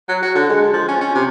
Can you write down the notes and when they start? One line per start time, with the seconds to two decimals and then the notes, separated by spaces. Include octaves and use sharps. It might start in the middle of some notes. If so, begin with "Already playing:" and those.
0.09 F#3
0.23 F#4
0.35 D3
0.50 G#3
0.73 F3
0.88 C#4
1.01 C#4
1.15 C3